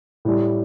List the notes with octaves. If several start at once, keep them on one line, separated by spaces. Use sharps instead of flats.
A2 G3